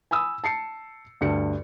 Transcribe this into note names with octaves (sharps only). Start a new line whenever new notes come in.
G#5 B5 D#6 E6
A5 C7 C#7
D2 G2 C#7